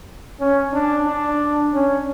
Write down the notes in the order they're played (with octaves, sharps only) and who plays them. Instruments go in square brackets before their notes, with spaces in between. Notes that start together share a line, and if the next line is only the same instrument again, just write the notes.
[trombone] C#4
D4
D4
C#4